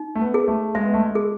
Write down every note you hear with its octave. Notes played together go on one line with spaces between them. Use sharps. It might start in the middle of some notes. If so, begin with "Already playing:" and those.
Already playing: D#4
A3
B3
G#4
A3
G#3 E5
B3
A3
G#3
G#4